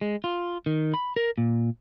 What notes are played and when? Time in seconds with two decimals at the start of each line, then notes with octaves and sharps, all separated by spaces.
0.01 G#3
0.24 F4
0.66 D#3
0.94 B5
1.16 A#4
1.38 A#2